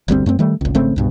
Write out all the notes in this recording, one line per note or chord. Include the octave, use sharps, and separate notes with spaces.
G1 D2 G3 C4
F#2 A3 C4
D#3 G3 A3
G#1 C#2
G#1 C#3 A3 C4
C2 G2 B2